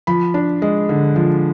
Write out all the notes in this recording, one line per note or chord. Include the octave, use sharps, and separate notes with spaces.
F3 B5
D4
G#3
D3
F3